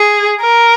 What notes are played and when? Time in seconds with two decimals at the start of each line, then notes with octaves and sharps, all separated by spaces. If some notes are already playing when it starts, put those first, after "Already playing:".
Already playing: G#4
0.41 A#4